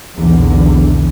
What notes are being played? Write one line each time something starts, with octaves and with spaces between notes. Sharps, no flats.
B1 E2 A#2 D3